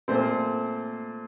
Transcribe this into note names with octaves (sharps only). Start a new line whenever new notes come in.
A#2 A3 C4 C5